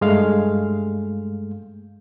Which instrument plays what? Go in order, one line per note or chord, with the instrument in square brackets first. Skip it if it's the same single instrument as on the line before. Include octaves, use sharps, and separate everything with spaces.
[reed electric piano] G2 G#3 A3 F5